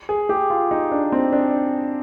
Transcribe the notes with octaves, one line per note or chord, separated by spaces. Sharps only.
G#4
G4
F4
D#4
D4
C4
D4